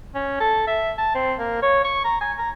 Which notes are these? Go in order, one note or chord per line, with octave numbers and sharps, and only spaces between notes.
C#4
A4
E5
A5
C4
A#3
C#5
C#6
A#5
G#5
A#5